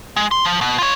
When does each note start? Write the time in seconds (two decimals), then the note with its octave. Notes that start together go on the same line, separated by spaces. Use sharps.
0.16 G#3
0.31 C6
0.45 F3
0.61 B2
0.79 F4 C#5